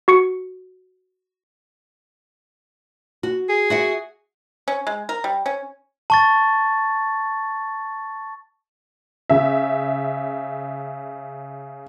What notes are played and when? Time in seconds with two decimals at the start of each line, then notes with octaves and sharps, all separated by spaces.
0.08 F#4 C#6 C#7
3.23 F#4
3.49 G#4
3.70 F#4 E5 F#5
4.68 C#4
4.87 G#3
5.09 A#4
5.24 G3
5.46 C#4
6.10 A5 C#6 A6
9.30 C#3 E5